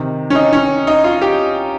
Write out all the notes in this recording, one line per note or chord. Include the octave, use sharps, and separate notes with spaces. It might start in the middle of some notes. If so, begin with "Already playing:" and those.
Already playing: C3 D#3
C#4
D#4
C#4
D#4
F4
G4